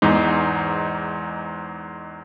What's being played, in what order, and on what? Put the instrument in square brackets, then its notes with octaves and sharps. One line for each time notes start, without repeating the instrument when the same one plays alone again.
[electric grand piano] E2 G#2 D#4